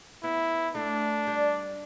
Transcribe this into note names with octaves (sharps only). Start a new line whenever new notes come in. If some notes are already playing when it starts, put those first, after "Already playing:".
B3 E4
A3 D4
G3